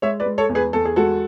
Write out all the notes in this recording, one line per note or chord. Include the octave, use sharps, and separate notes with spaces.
G#3 C#5 E5
B4 D5
G#3
A4 C#5
E2
G#4 B4
E2 A4
G#4
G#3 F#4 A4